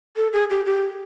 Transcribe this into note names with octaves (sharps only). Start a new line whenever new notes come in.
A4
G#4
G4
G4